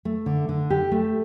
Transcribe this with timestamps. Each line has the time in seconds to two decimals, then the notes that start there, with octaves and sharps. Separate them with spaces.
0.05 A3
0.26 D3
0.49 D3
0.70 G4
0.91 A3